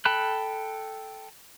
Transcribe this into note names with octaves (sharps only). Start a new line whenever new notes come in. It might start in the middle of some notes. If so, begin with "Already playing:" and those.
A4 G5 A5 B5 F#6